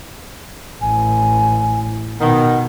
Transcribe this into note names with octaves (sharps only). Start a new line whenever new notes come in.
A1 G#5
B2 D#3 F#5